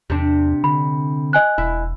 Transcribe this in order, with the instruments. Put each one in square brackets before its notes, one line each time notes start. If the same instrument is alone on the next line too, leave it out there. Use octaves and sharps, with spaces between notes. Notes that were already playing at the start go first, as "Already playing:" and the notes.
[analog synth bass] E2 [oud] C3 D4
[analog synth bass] D3 [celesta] B5
[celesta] D#5 G#5 F#6
[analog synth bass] E1 [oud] E4